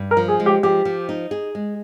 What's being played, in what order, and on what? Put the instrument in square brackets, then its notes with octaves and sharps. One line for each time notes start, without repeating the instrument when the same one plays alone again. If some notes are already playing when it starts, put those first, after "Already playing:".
Already playing: [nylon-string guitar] G2
[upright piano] A#4
[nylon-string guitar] F3
[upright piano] G#4
[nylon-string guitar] G#3
[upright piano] G4
[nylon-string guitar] F3 [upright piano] G4
[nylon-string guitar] F3
D#4
G#4
G#3